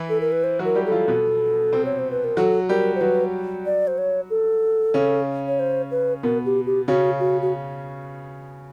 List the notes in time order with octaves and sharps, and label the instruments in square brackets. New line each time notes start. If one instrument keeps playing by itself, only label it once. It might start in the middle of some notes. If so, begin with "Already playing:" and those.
Already playing: [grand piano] E3 E4
[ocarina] A4
A#4
B4
C5
[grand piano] F#3 F#4
[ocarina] A#4
[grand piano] G3 G4
[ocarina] A4
[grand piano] F3 F4
B2 B3
C3 C4
[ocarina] C#5
C5
B4
A#4
[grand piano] F#3 F#4 [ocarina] A4
[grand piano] G3 G4 [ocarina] A#4
[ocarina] C5
[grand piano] F#3 F#4 [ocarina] B4
[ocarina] D5
C5
C#5
A4
[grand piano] C#3 C#4
[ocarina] C#5
C5
B4
[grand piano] B2 B3 [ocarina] A#4
[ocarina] G4
G4
[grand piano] C#3 C#4 [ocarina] F#4
[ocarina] F#4
F#4